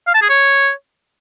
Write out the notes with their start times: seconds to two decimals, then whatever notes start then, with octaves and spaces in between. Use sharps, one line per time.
0.07 F5
0.14 A5
0.22 G#4
0.29 C#5